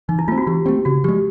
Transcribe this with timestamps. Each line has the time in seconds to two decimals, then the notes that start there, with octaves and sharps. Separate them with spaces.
0.09 E3 D#4
0.19 E4
0.28 A3 C4 F4
0.38 F#4
0.47 E3 G4
0.66 A3 C4 G4
0.85 C#3 F#4
1.04 F3 G#3 G4